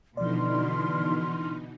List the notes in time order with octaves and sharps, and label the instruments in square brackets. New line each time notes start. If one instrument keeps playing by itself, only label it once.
[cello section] B2 [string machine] D3 E3 D#4 [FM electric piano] F3 D5 [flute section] C6 F6